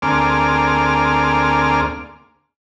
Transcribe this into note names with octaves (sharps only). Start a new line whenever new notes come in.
D2 A#3 C4 G#4 D5 F6